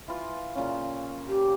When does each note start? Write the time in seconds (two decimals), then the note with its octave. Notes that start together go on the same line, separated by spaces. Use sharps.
0.08 E3 F4
0.55 A#2 C#3 C#4
1.28 G4